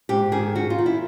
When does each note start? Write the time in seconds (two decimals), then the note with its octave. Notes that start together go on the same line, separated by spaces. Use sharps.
0.09 G#2 G4
0.32 D#3 G#4
0.55 D#3 F#4
0.70 F4
0.79 D#3
0.86 E4